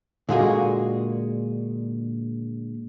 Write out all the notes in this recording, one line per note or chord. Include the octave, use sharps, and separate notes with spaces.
A#2 D3 G#3 A#3 F#4 G#4